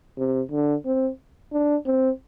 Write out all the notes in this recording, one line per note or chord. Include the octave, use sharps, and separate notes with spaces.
C3
D3
C4
D4
C4